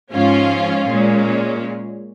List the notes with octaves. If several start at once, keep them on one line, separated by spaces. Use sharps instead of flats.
G#2 F3 C#4 F4
A#2 G#3 C#4